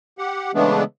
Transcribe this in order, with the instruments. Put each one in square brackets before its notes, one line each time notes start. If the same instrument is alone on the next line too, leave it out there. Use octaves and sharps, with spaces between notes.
[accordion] G4 F#5
C#3 E3 G#3 A3 B3 D4